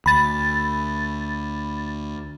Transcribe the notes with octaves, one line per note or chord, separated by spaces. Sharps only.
D2 B5 A6